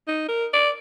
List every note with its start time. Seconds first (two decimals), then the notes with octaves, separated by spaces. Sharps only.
0.08 D#4
0.28 A#4
0.53 D5